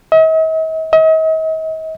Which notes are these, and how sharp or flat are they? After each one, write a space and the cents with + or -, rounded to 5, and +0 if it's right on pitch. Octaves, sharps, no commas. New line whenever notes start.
D#5 +45
D#5 +40